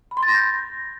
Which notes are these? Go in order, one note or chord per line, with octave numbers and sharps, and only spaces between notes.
B5
C6
A6
A#6
G6